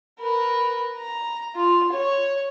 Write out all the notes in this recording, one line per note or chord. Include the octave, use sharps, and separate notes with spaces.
A#4 B4
A#5
F4
C#5